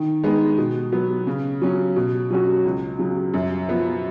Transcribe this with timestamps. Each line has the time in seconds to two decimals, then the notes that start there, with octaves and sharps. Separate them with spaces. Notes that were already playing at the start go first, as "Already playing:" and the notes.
Already playing: D#3
0.24 G#3 B3 D#4
0.58 B2
0.92 F#3 B3
1.27 C#3
1.62 F#3 C#4
1.96 B2
2.30 F#3 C#4 F#4
2.65 C#2
2.99 C#3 F#3
3.34 F#2
3.68 F3 B3